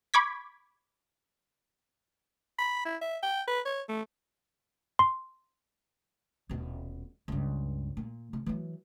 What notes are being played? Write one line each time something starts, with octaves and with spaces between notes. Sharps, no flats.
B5 C#6 D6 G#6 B6
B5
E4
E5
G5
B4
C#5
A3
C6
D#1 B2
C#2 G2
A#2
C3
E3 F#3